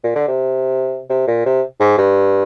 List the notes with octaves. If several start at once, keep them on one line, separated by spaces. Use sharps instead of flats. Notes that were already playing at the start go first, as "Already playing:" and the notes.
A#2
D3
C3
C3
A#2
C3
G#2
G2